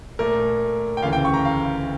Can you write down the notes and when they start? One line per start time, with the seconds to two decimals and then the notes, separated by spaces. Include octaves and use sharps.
0.19 A#2 A3 A#4
0.97 G5
1.02 D2 C#3 E3 F5
1.13 G5
1.25 C#6
1.34 A#5
1.45 F5